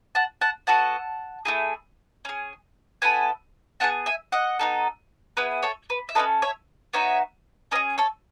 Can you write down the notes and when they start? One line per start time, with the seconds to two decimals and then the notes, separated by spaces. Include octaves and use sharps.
0.15 F#5 A5
0.41 F#5 A5
0.67 B3 F#4 A4 F#5 A5
1.45 A3 E4 G#4
2.25 C#4 G#4
3.02 B3 E4 A4 G#5 B5
3.80 B3 E4 G#4 F#5 A5
4.06 E5 G#5
4.32 D#5 F#5
4.59 B3 D#4 A4
5.37 B3 E4 G#4 B4
5.63 A4 C#5
5.90 B4
6.09 E5
6.15 C#4 F#4 A4 B4 D#5
6.42 C#5 E5
6.93 B3 D#4 F#4 C#5 E5
7.71 C#4 B4 D#5
7.75 G#4
7.98 A4 C#5